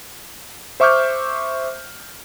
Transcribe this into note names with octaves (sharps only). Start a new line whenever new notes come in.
C5 E5 C#6 D6 F6 G6